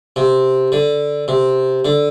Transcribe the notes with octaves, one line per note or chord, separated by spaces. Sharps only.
C3
D3
C3
D3